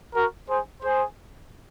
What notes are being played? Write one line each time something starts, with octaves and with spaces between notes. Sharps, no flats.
F#4 A#4
G#4 C5
G#4 C5